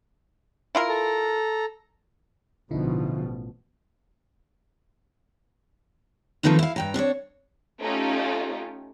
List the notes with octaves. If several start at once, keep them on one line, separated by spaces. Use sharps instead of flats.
E4 F4 A#4
A4 A#5
A1 B2 D3 F3 D#4 E4
D#3 F3 A3 C4 D#4 B4
E4 F5
G2 G5 A#5
C4 D4 C5 C#5
A3 C#4 D#4 F4 G4